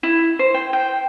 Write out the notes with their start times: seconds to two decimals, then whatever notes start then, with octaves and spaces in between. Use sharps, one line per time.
0.03 E4
0.39 C5
0.54 G5
0.73 G5